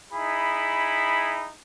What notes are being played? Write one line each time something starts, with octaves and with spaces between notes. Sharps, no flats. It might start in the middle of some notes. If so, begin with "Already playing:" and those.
D#4 E4 G#4 B5